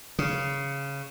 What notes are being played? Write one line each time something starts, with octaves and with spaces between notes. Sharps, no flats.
C#3